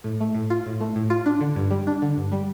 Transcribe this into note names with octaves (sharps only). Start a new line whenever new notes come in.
A2
A3
A2
F4
A2
A3
A2
F4
D4
D3
G2
G3
D4
D3
G2
G3